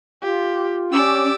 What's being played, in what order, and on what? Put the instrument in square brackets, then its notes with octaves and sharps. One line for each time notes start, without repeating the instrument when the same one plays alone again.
[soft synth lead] F4 [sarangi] G4
[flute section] C#4 [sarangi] G4 [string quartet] D5 D6 E6